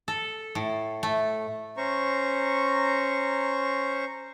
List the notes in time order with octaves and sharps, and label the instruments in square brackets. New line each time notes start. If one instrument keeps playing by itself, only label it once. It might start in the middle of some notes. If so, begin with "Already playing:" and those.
[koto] A4
A2
A3
[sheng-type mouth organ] C#4 C5 A#5 C#6